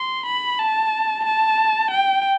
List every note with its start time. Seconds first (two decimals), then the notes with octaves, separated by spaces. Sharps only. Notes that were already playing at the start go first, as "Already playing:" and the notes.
Already playing: C6
0.26 B5
0.60 A5
1.25 A5
1.91 G5